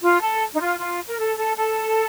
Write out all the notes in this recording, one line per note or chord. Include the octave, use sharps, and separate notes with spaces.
F4
A4
D#4
F4
F4
A#4
A4
A4
A4